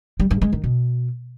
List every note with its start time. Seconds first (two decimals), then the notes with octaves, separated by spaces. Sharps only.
0.20 G3
0.31 G2
0.42 G#3
0.53 D#3
0.64 B2